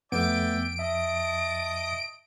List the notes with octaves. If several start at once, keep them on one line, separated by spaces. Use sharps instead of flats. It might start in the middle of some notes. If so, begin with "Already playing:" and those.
F2 A3 B3 D5 E5 G5 D7
D#5 E5 A5